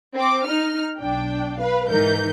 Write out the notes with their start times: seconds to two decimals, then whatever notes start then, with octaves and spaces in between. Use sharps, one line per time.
0.15 C4 D6
0.44 D#4 F6
0.99 B1 D4 G5
1.58 B4 F5
1.89 G#2 E3 D#4 A#4 G6